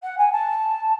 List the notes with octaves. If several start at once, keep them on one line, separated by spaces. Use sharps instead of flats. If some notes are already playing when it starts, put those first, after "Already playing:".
F#5
G#5
A5